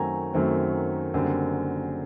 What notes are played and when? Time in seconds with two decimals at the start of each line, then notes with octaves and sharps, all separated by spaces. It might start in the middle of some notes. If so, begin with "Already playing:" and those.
Already playing: F#2 D#3 F#3 A3 C4 G#5 A#5
0.34 F#2 D#3 F#3 A3 C4
1.14 F#1 F#2 D3 G3 C4